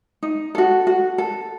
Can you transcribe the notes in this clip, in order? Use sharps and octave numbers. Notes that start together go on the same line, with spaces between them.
D#4
F#4 A4
F#4
A4